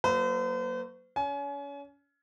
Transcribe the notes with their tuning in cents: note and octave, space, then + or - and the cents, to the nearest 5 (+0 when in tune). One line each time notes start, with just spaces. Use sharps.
F#3 +0 A#3 +0 C5 -45
C#4 +35 G#5 +30